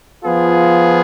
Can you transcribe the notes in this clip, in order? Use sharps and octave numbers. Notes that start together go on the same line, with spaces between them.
F3 B3 F4 G#4